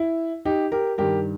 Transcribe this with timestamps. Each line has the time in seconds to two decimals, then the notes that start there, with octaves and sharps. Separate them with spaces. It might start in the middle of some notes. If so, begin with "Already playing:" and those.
Already playing: E4
0.45 D#4 G4
0.72 G4 A#4
0.98 G2 D#3 G4 A#4